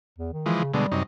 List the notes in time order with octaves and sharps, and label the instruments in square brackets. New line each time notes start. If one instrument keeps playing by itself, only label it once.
[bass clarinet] E2
D#3
[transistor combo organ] E3 F3 G#3
[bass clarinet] C#3
[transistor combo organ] B2 D3 G#3 [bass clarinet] G3
[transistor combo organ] F#2 C3 D#4